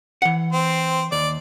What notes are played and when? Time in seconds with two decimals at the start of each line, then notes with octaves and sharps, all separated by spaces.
0.22 E3 F#5
0.53 C4
1.12 D#2 D5